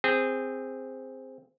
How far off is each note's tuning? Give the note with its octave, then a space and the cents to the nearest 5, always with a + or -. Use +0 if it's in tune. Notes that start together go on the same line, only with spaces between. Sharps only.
C4 +0 G#4 -15